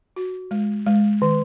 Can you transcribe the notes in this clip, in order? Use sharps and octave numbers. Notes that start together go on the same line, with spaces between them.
F#4
G#3
G#3
D#3